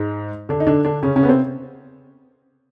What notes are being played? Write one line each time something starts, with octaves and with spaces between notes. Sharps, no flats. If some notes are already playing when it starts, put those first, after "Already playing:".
Already playing: G#2 G#3
D3 D4
D#4
D3 D4
D3 D4
C#3 C#4
C#3 C#4
B3
C3 C4